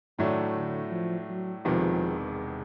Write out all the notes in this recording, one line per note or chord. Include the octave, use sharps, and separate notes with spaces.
A2 D#3 F#3 A3 D4
D3
F3
F#3
E1 E2 C3 D#3 F3